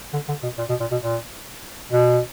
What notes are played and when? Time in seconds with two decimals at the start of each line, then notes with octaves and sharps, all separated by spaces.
0.13 D3
0.28 D3
0.43 B2
0.58 A#2
0.69 B2
0.80 A#2
0.91 B2
1.03 A#2
1.92 B2